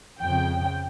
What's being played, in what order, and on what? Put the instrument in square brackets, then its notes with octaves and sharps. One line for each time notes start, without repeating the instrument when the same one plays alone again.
[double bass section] F2 C#3 [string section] G5